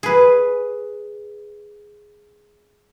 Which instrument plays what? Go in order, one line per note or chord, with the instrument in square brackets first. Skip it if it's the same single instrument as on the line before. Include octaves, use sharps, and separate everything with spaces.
[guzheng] G#4 B4